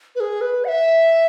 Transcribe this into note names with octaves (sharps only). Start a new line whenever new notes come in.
B4
G#4
B4
F#5
E5